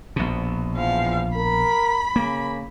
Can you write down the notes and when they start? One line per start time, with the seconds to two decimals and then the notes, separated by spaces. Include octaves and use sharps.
0.16 A#1 B2
0.75 E2 F3 F5
1.36 A#4 B5
2.16 C#3 A#3